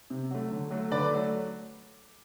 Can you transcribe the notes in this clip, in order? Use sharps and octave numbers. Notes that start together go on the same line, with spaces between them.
C3
F#3 A3
D3
F#3 A3
D3 B4 D5
F#3 A3